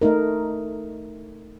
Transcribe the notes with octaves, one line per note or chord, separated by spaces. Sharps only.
A3 D#4 A#4